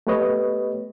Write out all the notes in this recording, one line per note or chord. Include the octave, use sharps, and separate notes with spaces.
A3 B3 G4 B4 C#5 D#5